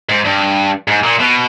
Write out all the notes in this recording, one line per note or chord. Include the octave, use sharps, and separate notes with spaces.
G#2
G2
G#2
A#2
B2